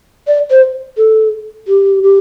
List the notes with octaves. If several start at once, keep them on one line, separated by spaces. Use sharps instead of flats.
D5
C5
A4
G4
G4